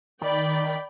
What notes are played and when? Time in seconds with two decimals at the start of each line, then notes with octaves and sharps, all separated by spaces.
0.22 D#3 D5 G5 B5